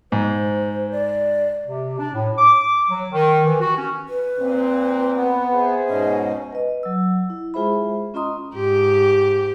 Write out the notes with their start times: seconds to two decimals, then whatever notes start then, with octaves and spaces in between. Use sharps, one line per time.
0.12 G#2 C5
0.92 D5
1.66 C3
1.99 D4
2.14 A2
2.38 D6
2.90 F#3
3.11 D#3
3.46 E3
3.61 F#4
3.76 C#4
4.09 B4
4.40 A#2 C4
5.16 B3
5.53 G#4 C5 E5
5.89 G#2 B2 C#4 D#5
6.53 B4 D#5
6.83 F#3 E6
7.30 E4
7.54 G#3 F4 G#4 C5 E5 B5
8.14 C#4 F4 D#5 A#5 C6 D#6
8.55 G#2 G4